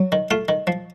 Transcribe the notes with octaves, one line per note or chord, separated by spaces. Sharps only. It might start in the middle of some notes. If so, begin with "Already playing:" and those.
Already playing: F#3
D#3
A3 F4
D#3
F3